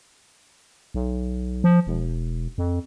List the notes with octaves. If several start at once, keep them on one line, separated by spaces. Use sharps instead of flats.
B1
F3
E1
F2